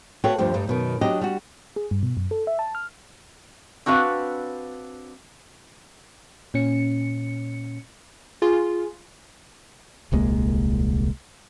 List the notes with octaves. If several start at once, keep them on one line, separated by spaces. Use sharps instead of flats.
F#4 A4 B4 C#5 F5 G5
D2 G2 D3 F3 G4 C5
G2 G3 D#4
F#2 B2 D#3
F#3 D4 F#4 G4 D#5
G3 F#4
G#4
G2
B2
F#2
A4
E5
A5
F6
C4 D4 F#4 B4 F5
A#2 C#4 C#7
F4 G#4
D#1 C2 G#3 A#3